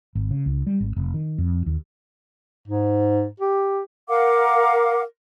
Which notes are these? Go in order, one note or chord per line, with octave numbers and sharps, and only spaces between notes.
G#1
C#3
C#2
G3
G#1
F1
D#3
F2
D#2
G#2
G4
A#4 F5 F#5 D6